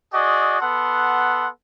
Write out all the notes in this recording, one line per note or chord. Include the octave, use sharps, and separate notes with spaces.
F#4 G#4 D5 D#5
B3 A4 F#5 C6